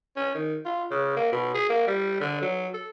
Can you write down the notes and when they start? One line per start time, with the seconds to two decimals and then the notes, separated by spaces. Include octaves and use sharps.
0.16 C#4
0.35 D#3
0.65 F4
0.91 C#3
1.16 A#3
1.32 B2
1.54 G#4
1.69 A#3
1.87 G3
2.20 D3
2.42 F#3
2.74 A4